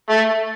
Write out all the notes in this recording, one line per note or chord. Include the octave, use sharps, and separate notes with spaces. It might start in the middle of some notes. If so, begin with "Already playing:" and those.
A3